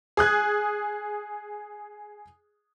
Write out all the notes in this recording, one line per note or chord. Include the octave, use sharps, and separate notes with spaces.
G#4 D#6 F#6 G#6